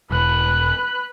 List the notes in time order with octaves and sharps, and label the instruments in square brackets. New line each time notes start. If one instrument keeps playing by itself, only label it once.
[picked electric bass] E1 [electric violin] B4 F#6